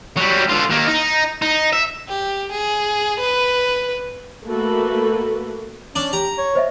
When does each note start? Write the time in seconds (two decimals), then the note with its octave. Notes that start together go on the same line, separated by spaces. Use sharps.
0.17 F#3 G3
0.49 D3 F4
0.70 D#3 A#3
0.87 D#4
1.42 D#4
1.73 E5
2.08 G4
2.52 G#4
3.20 B4
4.45 A3 A#3 F#4 A4 B4
5.96 C#4 D4
6.13 G4 A#5
6.38 C#5
6.55 C5 D#5 E5